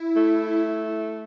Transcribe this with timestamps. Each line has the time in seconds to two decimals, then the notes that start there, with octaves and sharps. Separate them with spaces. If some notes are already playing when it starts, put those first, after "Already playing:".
Already playing: E4
0.16 A3